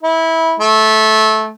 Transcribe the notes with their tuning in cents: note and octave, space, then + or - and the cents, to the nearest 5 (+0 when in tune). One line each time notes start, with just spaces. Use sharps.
E4 -20
A3 -15